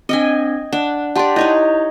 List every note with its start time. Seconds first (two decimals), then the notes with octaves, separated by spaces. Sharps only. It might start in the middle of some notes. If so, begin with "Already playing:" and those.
0.09 C4 D4 D#5 G5 G#5
0.73 D4 F#5
1.16 G4 D5 F#5 A5 C6
1.36 D#4 E4 C#5 D#5 G6